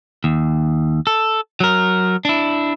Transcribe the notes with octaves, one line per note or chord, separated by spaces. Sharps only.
D#2
A4
F#3 A#4
D4 E4